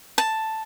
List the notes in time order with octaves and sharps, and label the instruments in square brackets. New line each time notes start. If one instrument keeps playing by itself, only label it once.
[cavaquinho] A5